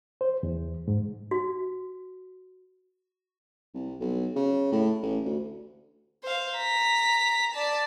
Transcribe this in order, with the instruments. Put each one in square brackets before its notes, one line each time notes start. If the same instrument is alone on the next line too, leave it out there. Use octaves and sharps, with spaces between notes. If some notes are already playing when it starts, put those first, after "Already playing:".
[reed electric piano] C5
E2
G#2
[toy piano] F#4
[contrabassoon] C2
B1
C#3
A2
A1
D2
[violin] C5 F5
A#5 B6
D5 A5